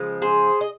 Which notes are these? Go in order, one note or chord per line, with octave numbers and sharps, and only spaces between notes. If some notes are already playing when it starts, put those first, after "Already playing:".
Already playing: C#3 F3 G#3
G#4 C5
D#5